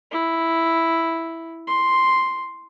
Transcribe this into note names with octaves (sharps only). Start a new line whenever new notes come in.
E4
C6